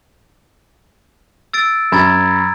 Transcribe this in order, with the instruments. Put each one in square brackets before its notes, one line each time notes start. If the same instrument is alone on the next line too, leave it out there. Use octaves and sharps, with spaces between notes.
[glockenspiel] E6 A6 D7
[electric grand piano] F#2 [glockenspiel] A#5 G#6 A6 [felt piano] B5